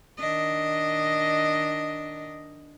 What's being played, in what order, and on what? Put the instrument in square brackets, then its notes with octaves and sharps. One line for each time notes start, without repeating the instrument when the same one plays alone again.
[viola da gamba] D#3 D4 D#5